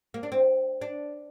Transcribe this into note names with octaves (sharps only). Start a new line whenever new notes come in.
A#3
D4
C4
D4